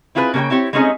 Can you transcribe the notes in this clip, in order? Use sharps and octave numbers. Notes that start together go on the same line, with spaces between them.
C4 E4 F4 G#4 A#4 B4
C#3 A#3 A4 C#5 G5
C4 E4 G4 C#5
G#3 A3 C4 C#4 D#4 G#4